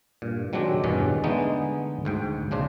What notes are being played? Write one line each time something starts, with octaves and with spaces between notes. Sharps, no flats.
G2 A#2
D#3 F#3 G#3 C4 D4 G4
E2 G2 B2 D#3 C#4
D3 G#3 A3 B3 D#4
D2 G#2 G5
A#1 C#3 D4 C5